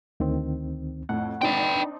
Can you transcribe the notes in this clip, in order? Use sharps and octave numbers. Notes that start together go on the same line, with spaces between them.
D2 D#3 C4
F2 A2 F#5
C4 D4 D#4 B4 G5